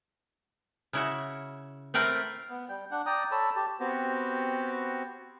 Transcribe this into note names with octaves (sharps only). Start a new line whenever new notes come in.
C#3 E4 F#4
A3 C4 A#4 B4
B3
G3 G5
D4 F#5
D5 G5 A#5 D#6
A4 C#5 A5 B5
G4 A5
B3 C4 F#4 G4